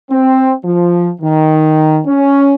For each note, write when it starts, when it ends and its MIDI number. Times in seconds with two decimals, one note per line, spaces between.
0.11 0.53 60
0.65 1.11 53
1.22 1.99 51
2.07 2.54 61